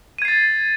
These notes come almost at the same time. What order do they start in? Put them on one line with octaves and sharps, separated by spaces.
D#7 G#6 C7 A6